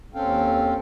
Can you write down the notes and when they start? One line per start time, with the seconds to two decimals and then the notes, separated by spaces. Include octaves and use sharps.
0.14 D#2 C4 C#4 A4 F5 G5